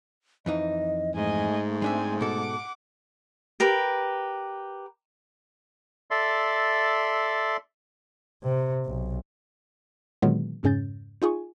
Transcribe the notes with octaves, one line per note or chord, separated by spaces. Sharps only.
F2 E3 D#4 D#5
G#2 A3 D#5 G#5
G#3 C4 D4 E5 G#5
B2 A4 F#5 D6
G4 A#4 B4 B5
A4 D5 E5 C6
C3
B1
A#2 D3 D#3 F#3 G#3 B3
F2 G#2 C#3 C#4 G6 A6
D#4 F4 G#4 G#5 C#6